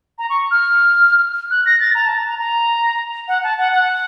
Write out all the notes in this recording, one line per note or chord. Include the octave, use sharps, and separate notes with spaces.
A#5
C#6
F6
F#6
A#6
A6
A#5
A5
A#5
A#5
A#5
F#5
A5
F#5
F#5